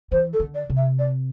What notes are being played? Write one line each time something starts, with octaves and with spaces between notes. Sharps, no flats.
E3 C5
A4
D3
D5
C3
E5
D5